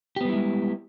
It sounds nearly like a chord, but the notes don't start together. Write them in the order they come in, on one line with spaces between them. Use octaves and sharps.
G4 B3 G3 E4 G#3